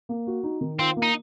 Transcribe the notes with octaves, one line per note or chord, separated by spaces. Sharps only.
A#3
F#4
D#4
D#3
C4 F4
A#3
D#4